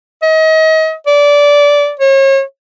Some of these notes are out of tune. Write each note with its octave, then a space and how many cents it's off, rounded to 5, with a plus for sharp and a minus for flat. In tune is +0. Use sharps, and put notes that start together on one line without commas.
D#5 +35
D5 -20
C#5 -35